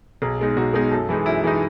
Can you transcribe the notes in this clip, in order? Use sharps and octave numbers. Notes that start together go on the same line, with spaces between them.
B1 G#4
B2 G#3 D#4
B1 F#4
B2 G#3 D#4 G#4
F#2 A4
E3 G#3 D#4
F#2 E4
E3 G#3 D#4